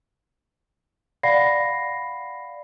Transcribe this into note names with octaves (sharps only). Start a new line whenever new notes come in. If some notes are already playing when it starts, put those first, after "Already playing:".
D5 F5 F#5 B5 A#6 C7